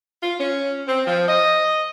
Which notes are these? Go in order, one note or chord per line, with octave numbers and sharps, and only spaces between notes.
F4
C#4
C4
F3
D#5